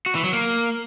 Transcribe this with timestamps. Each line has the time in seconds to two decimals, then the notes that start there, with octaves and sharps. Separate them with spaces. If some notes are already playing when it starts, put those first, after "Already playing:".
0.06 F#4
0.15 E3
0.24 F#3
0.33 A#3